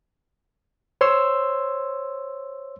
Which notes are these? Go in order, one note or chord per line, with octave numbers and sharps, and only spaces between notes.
C5 C#5 C6 E6